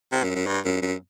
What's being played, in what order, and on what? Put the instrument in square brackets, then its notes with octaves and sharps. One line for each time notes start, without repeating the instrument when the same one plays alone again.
[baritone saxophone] C3
F#2
F#2
G2
F#2
F#2